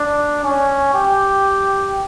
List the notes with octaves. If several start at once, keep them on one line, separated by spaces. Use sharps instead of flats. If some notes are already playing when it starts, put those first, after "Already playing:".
Already playing: D4
C#4
G4